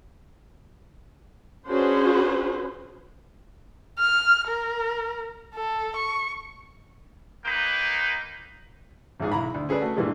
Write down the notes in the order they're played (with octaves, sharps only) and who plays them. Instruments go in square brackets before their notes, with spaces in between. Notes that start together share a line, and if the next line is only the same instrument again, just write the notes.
[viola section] C#4 D4 F#4 G#4 B4 C5
[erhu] F6
A#4
A4
C#6
[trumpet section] A#3 D#4 B4 G5
[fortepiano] A1 E2 G#2 G#4
B1 E4 A#5 B5
D2
C#4 G#4 A4 B4 D5
A3 F#4 F#5
G2 A#2 E3 G3 G#3